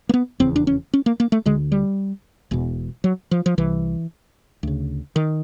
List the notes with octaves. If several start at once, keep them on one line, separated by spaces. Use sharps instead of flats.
A#3
B3
F1 E2 C#3 C4
D4
C#4
C#4
A#3
A#3
A3
D2 D3 G#3
G3
E1 E2 B2
F#3
F3
F3
C2 C3 E3
D2 C#3
D#3